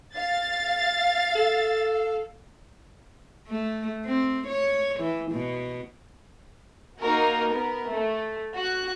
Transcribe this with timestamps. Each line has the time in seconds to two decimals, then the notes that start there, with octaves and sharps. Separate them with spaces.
0.16 F5 A6
1.36 A4
3.48 A3
4.06 C4
4.48 C#5
5.00 E3
5.32 B2
6.99 A#3 D#4 F#4 A#4
7.50 B3 A#4
7.88 A3
8.55 F#4 F#6